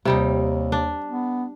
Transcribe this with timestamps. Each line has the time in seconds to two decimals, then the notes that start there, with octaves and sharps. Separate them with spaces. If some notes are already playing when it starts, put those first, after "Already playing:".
0.05 D#2 C3 G3 D#4
0.72 D4
1.06 B3